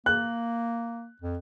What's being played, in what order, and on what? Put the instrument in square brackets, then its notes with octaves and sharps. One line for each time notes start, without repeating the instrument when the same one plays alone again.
[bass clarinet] A#3 [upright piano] F#6
[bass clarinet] F2